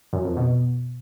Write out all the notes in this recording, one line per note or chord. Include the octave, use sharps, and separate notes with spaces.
F#2
F2
B2